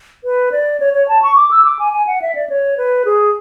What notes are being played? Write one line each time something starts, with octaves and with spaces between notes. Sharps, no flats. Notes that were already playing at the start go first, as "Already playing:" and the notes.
B4
D5
C#5
C#5
A5
C#6
D6
E6
D6
G#5
G#5
F#5
E5
D5
C#5
B4
G#4